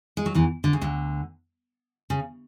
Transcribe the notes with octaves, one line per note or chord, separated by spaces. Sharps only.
G#3
F#3
E2 E3
D3
C#3
D2 D3
C#3